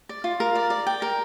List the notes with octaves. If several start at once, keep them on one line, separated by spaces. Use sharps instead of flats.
D5
F4
A#4
D5
D5
G5
A#4